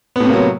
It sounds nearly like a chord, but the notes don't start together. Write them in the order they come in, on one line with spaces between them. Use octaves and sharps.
B3 A2 C3 A#3 F#3